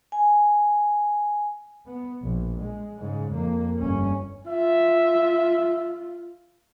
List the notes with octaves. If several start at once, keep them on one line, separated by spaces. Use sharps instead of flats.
G#5
B3
A#1
G#3
G#2 C#3
F2 A#3
G1 C#4
F4 E5